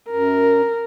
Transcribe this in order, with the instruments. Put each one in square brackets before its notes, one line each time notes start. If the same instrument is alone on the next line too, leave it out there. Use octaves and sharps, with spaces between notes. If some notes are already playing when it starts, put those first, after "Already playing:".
[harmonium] F#2 [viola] A#4